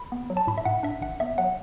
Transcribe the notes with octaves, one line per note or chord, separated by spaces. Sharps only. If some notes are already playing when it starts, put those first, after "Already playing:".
Already playing: B5
B3
F#3
A5
A2 B5
E5
A2 F#5
D4 E5
A1 F#5
B3 E5
F#3 F#5